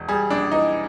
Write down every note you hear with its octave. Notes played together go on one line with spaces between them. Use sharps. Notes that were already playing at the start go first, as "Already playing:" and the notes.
Already playing: E1
G3 G#4
A#1 D4
E3 D#4